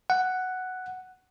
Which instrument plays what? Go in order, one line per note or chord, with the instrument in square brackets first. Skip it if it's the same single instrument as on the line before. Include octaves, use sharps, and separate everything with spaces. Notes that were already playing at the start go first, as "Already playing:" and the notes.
[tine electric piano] F#5